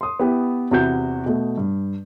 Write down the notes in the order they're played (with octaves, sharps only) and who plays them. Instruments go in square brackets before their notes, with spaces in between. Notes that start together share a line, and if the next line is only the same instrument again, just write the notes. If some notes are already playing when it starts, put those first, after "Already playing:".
[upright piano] C6 D#6
B3 E4 G4
E2 C3 E4 F#4 G6
B2 A3
G2